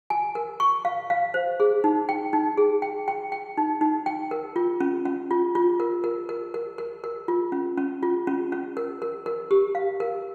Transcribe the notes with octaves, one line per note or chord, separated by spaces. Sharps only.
G#5
A#4
C#6
F5
F5
C5
G#4
D#4
G5
D#4
G#4
G5
G5
G5
D#4
D#4
G5
A#4
F4
C#4
C#4
F4
F4
A#4
A#4
A#4
A#4
A#4
A#4
F4
C#4
C#4
F4
C#4
C#4
A#4
A#4
A#4
G4
F5
A#4